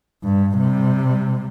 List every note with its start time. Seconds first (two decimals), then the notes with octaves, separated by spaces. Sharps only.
0.23 G2
0.55 C3 G3